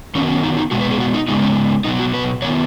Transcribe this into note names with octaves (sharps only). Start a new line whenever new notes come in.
D#3 F#3 B3 C#4
C#4
D#4
D#4
B2 G#3 B3 F#4
B4
G#4
F#4
D#4
C#3 G#3 B3 D#4
C#4
B2 F#3 B3 D#4
F#4
B4
D#3 B3 C#5